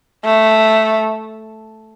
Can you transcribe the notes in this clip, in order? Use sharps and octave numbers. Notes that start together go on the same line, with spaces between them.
A3